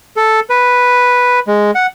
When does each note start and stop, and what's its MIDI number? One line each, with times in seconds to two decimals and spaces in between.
0.16 0.40 69
0.50 1.40 71
1.47 1.71 56
1.75 1.86 78